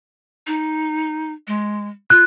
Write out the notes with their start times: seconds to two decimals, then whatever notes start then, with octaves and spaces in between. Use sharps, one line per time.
0.47 D#4
1.47 G#3
2.10 F4 F#6